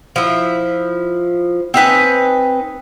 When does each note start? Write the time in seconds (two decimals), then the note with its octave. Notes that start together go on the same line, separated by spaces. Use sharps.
0.16 F3 E4
1.74 C4 D#4 B4 G#5